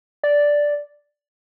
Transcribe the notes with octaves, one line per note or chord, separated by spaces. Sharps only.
D5